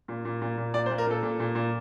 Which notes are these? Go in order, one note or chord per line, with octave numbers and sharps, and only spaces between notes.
A#2
A#2
A#2
A#2
A#2 D5
C5
A#2
A#4
A#2 A4
A#2
A#2
A#2